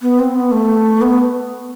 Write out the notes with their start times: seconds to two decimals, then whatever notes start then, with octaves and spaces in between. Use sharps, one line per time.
0.02 B3
0.19 C4
0.35 B3
0.52 A3
1.02 B3